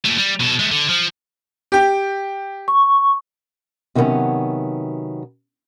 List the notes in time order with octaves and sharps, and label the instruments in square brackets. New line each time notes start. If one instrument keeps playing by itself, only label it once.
[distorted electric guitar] A#2 A3
G3
B2 A4
G#3 A3
D3
F3
[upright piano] G4 G5
[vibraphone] C#6
[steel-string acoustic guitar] C3 D#3 F#3 G3 B3 C#4